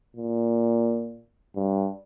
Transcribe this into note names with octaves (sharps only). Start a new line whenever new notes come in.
A#2
G2